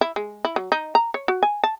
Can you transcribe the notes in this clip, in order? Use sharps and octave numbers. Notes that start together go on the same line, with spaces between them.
E4
G#3
E4
F#3
D#4
A#5
C#5
F#4
G#5
A5